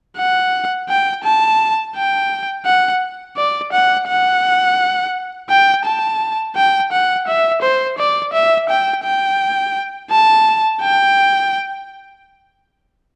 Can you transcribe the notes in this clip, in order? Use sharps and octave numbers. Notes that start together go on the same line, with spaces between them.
F#5
G5
A5
G5
F#5
D5
F#5
F#5
G5
A5
G5
F#5
E5
C5
D5
E5
G5
G5
A5
G5